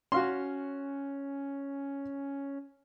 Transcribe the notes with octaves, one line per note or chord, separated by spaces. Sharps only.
C#4 F#4 F5 C6